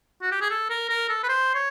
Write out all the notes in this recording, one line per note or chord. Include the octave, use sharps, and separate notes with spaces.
F#4
G4
G#4
A4
A#4
A#4
A4
B4
C5
C#5